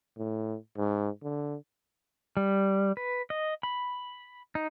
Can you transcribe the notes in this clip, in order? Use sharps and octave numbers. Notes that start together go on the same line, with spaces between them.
A2
G#2
D3
G3
B4
D#5
B5
D#4